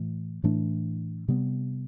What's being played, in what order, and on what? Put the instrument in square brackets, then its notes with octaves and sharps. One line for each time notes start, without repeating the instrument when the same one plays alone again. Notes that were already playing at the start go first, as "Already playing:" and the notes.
Already playing: [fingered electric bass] A2 E3 A3
A2 E3 A3 D4
C3 G3 B3